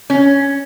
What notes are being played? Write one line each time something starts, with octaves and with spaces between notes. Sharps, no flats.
C#4